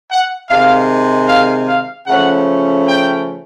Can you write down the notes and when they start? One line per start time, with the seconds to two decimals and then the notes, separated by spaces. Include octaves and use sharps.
0.10 F#5
0.49 C3 D#3 G#3 F5
1.28 F5
1.68 F5
2.07 C#3 F3 A3 C#4 F#5
2.86 G5